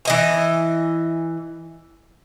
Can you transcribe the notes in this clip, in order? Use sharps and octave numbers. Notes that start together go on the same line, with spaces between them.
E3 D#5 G#5